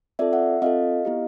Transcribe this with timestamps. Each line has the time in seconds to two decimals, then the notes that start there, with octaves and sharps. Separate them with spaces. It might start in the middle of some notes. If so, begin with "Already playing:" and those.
0.19 C4 F4 A4 D5 E5
0.33 E5 F#5
0.62 C4 F4 A4 D#5 F5
1.05 B3 E4 G4